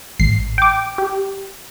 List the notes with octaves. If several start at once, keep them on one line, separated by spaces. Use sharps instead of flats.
A1 C7
G5 D6
G4